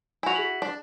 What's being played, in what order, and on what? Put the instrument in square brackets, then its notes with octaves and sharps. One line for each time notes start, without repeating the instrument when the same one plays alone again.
[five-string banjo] E4 F#4 [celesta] G#5 F7
[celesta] G#4 B6 F#7
[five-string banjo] D4